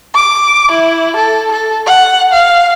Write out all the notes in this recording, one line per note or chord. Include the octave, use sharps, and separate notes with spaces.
D6
E4
A4
A4
F#5
F5